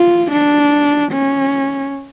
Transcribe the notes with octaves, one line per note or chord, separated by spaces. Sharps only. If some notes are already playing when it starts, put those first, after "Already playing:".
Already playing: F4
D4
C#4